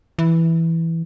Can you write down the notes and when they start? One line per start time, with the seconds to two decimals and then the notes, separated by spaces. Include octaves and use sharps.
0.19 E3